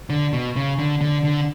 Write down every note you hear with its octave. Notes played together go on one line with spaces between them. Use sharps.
D3
B2
C#3
D3
D3
D3